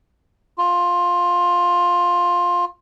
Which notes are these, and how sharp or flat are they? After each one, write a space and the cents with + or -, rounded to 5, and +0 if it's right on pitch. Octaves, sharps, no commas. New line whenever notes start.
F4 +10